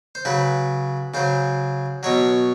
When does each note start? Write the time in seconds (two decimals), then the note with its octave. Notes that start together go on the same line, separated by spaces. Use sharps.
0.15 C5
0.25 C#3 F#3 B4
1.14 C#3 F#3 C5
2.03 B2 F#3 C#5